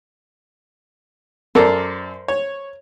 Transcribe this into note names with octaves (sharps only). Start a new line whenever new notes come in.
F#2 A4 A#4 C5 D5
C#5